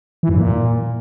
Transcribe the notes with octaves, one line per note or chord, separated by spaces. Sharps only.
E3
F#2
A#2